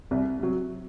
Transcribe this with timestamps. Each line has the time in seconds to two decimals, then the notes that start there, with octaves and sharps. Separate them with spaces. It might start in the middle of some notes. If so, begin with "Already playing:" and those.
0.11 C2
0.39 C3 F#3